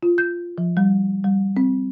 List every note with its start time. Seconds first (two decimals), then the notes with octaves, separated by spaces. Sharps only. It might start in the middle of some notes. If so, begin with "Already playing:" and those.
0.03 F4
0.18 G6
0.58 F3
0.77 G3
1.24 G3
1.57 C4